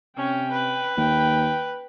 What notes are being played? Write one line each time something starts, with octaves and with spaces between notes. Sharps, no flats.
C3 C#4 G5
B4
D#2 G5